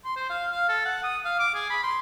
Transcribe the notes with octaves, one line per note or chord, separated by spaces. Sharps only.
C6
C5
F5
F5
A4
F#5
D#6
F5
D6
G#4
B5
C6